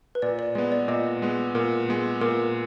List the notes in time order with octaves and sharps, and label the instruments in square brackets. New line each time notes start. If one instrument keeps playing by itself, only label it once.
[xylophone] B4
[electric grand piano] A#2 [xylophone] D5
[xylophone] D5
[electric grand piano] G#3 B3 [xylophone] D5
[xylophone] D5
[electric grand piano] A#2 [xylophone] D#5
[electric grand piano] G#3 B3
[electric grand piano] A#2 [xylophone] A#4
[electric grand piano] G#3 B3
[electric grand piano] A#2 [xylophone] A#4